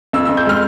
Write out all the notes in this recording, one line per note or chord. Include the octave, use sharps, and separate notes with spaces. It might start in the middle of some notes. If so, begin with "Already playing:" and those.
F2 E6
E6
F2
G6
G#3 F6